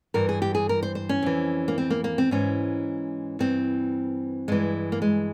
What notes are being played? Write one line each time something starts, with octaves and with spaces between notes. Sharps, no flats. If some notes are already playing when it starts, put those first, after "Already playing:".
G2 E3 A#4
G#4
G4
G#4
A#4
C5
C5
C#4
F2 E3
A#3
C4
A#3
A#3
C4
G#2 E3 C#4
G2 E3 C4
G2 E3 G#3
A#3
G#3